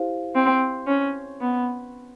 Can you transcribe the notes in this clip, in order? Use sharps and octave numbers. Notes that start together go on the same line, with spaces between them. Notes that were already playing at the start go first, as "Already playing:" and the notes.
Already playing: E4 G4 C5 F5
C4
C#4
B3